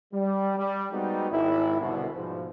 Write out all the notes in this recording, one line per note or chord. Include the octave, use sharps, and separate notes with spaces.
G3
G3
G3 G#3 B3 C4 D#4 F#4
G#1 E4
C2 B2 D3
G#2 B2 F3